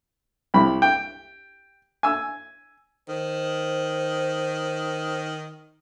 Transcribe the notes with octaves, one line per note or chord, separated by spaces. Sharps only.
C2 B5
G5
G#5 E6
D#3 C5